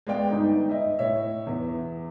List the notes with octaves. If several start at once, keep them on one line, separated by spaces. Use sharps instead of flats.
G#3 B3 G#4 D5 F5 G5
G1 D#4
D#5 E5
A2 C#5 E5
E2